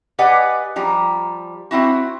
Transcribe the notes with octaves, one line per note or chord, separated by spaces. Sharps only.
G4 B4 D5 D#5 F#5 G#5
F3 G3 A#5
C4 C#4 E4 F#4